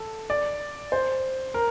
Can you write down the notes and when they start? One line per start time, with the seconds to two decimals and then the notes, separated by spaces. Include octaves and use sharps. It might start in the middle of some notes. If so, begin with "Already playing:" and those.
Already playing: A4
0.30 D5
0.92 C5
1.54 A#4